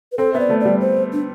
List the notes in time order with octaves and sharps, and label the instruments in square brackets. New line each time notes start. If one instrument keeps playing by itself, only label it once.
[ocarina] B4
[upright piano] C4 [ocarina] A4
[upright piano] B3 [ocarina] E5
[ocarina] D5
[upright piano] A3
[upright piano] G3 [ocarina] D5
[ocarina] C5
D4